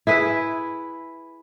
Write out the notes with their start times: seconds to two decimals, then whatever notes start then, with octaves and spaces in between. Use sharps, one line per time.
0.07 E4 G#4 B4 E5